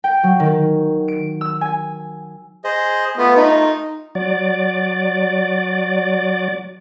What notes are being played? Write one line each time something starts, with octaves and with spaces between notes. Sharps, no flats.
G5
F#3
D#3
D7
E6
G#5
G#4 C5 D#5
A3 B3 F4
D#4
F#3 D5